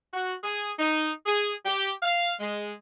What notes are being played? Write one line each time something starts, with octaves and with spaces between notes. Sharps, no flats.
F#4
G#4
D#4
G#4
G4
F5
G#3